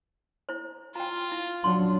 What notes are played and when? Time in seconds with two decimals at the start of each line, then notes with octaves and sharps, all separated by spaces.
0.49 E4 C5
0.95 F4 G5 A#5
1.32 E4
1.64 F#3 D4 C6